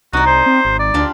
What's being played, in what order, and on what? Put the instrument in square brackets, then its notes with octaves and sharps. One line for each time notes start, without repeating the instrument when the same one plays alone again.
[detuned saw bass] C2 [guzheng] D#4 D5 [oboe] F#4
[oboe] C5
[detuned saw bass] C4
G#1
[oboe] D5
[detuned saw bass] D2 [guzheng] D4 F4 G4